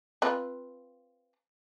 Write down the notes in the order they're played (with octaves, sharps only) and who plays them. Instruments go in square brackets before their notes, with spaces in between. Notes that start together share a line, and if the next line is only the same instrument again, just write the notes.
[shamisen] C4 F4 B4